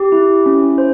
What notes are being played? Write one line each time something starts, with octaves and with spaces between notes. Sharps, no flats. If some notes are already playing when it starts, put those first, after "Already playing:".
Already playing: G4
E4
C#4
C5